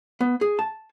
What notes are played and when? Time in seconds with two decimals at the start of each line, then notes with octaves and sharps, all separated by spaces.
0.21 B3
0.41 G#4
0.59 A5